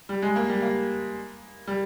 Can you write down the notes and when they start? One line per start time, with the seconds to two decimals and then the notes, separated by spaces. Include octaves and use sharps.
0.09 G3
0.22 G#3
0.36 A#3
0.49 G3
0.62 A#3
1.67 G3